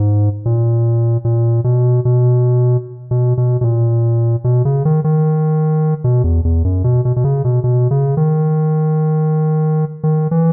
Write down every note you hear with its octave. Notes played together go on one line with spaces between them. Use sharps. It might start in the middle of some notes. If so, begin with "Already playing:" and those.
Already playing: G#2
A#2
A#2
B2
B2
B2
B2
B2
A#2
B2
C#3
D#3
D#3
B2
E2
E2
F#2
B2
B2
B2
C#3
B2
B2
C#3
D#3
D#3
E3